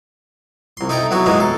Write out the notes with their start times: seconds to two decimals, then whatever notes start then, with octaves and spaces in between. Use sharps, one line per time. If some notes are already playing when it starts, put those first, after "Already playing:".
0.77 C2 C6
0.89 D#4 E4 A4 G5 A#5
1.11 F#3 B3 E4 F#4
1.26 E3 G#3 A#3 B3 D#4 E4
1.40 A4